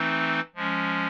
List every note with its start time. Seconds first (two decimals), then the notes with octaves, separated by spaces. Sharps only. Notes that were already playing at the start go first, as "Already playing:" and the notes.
Already playing: E3 A3 C4 D#4
0.55 F3 G#3 C#4